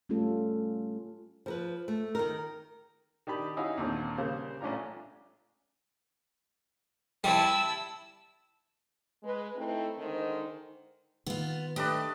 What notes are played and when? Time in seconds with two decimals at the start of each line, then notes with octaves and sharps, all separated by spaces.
0.09 G3 A3 C#4 F4 A4
1.46 F3 A#4 B4
1.88 A3
2.15 D#3 D#4 A#4
3.27 D#3 D4 G4 B5
3.57 C#4 D#4 E4 F#4 F5 G#5
3.78 D#2 A#2 D3 C4
4.18 C#3 G3 A#3 C5
4.61 A1 C#4 D4 F4 A#5
7.24 G3 E4 A5 E6
9.23 G#3 B4
9.56 A3 C4 D#4 E4
9.98 D3 D#3 G#3 D#4 C5
11.26 D#3 B3 F4
11.76 A3 D4 G4 B4 D#5